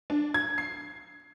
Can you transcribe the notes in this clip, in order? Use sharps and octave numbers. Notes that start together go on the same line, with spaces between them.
D4
G#6
C7